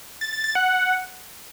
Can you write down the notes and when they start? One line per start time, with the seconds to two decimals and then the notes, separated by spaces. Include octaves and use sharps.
0.21 A6
0.33 A6
0.44 A6
0.55 F#5